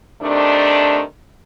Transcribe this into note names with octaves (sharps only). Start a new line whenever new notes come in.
C3 D#3 A3 D4